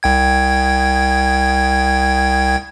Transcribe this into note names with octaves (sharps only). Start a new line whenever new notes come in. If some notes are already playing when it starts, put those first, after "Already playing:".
C2 G5 G#6